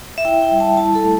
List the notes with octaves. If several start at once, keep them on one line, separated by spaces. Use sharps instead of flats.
E5
E4 G5
G5
G3
A5
E4 A5
A4
A3